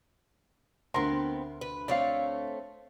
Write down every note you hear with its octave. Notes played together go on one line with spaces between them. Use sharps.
D2 B3 C4 A#4 C6
B4
A3 C4 C#5 D5 F5